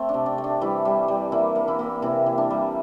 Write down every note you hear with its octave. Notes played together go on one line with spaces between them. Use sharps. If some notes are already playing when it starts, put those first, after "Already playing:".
Already playing: A3 C4
D4
C3
D4
A3
D4
E3 G3 E4
G3
G3
E3 A#3 E4
A#3
E3 E4
A#3
C3 E3 E4
E3
D4
G3